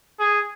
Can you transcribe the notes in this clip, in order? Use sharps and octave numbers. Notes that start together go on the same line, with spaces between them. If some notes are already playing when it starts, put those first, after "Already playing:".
G#4